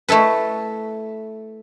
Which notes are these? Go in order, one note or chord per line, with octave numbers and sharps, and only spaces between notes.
A3 E4 A4 B4